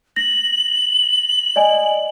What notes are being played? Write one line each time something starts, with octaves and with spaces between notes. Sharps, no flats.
A#6 F#7
D5 D#5 G#5